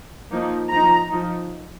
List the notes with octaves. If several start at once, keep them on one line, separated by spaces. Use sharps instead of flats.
F3 A#3 D#4
F3 D#4 A#5
F3 D#4